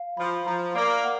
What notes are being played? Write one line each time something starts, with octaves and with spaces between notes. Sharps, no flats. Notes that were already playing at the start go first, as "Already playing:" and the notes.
Already playing: F5
F3 B5
F3 A#5
A#3 D5
F#5